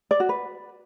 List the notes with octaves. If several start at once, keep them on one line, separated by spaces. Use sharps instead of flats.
D5
F#4
B4